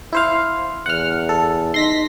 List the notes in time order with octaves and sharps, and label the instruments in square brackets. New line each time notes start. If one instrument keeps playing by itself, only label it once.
[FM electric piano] E4 C5 F5
[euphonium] E2 [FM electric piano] F#5 F6
[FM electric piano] A4
[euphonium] D#4 [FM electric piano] C6 A#6 B6